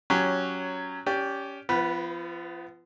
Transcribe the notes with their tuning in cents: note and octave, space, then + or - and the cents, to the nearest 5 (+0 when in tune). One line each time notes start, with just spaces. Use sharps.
F#3 +0 C#4 +10 G4 +0
C#4 +20 G4 +0 D5 +0
F3 -30 B3 +20 B4 -10